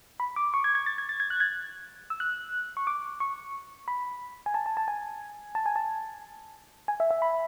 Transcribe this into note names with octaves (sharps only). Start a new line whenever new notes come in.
B5
D6
C#6
G#6
G#6
A6
G#6
A6
G#6
F#6
G#6
E6
F#6
C#6
D6
C#6
B5
G#5
A5
A5
A5
G#5
A5
G#5
A5
G#5
E5
E5
B5